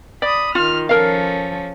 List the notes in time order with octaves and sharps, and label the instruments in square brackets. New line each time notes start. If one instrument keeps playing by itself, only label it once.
[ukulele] D5 [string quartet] B5 D#6
[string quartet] D#3 F6 [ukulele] F4
[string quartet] F3 C#4 A4 [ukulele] A#4 F5